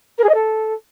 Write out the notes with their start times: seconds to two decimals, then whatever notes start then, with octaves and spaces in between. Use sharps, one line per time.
0.18 A#4
0.24 G#4
0.29 D#5
0.34 A4